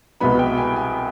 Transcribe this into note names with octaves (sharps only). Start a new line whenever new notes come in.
C2 B2 G#3 B3 B5
G5
G#5
G#5